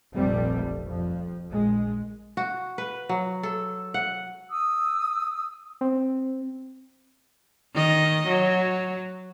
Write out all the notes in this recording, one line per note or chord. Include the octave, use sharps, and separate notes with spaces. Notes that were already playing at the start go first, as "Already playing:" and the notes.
F1 A#1 G3 A3 C4
F2 F3
A#1 G#3
F#4
B4
F#3
A4
F#5
D#6 E6
C4
D#3 D#5
F#3